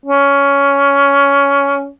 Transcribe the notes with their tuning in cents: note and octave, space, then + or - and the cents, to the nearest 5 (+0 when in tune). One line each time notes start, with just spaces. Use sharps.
C#4 +15